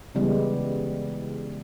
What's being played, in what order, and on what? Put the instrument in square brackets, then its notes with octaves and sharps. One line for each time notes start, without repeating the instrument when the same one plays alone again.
[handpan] C#3 E3 G3 G#3 B3